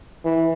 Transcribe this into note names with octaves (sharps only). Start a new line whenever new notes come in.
E3